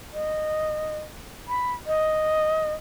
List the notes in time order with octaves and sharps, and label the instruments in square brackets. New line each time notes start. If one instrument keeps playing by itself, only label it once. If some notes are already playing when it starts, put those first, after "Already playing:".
[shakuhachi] D#5
B5
D#5